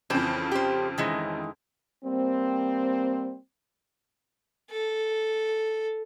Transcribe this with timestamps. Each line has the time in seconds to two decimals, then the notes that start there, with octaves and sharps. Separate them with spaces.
0.10 F2 C#3 E3 C4 C5 A5
0.52 G4 C5
0.98 D#3 E3 G#3
2.04 G3 A#3 C4
4.71 A4